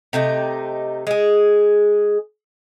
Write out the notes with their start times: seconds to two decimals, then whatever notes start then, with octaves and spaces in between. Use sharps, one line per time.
0.13 C3 A3 D#4 G4
1.07 G#3 G#4